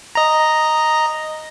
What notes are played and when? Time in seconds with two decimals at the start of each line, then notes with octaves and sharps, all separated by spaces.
0.15 D#5 A#5